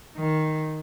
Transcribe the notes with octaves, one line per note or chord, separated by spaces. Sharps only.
D#3